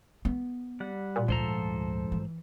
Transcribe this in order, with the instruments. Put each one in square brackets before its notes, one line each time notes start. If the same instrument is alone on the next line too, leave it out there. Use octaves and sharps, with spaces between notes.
[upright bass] B3
[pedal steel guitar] G3 F#5
[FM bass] A#2
[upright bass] D2 [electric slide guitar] G#2 C5 A#5 [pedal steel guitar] F3 A4
[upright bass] E3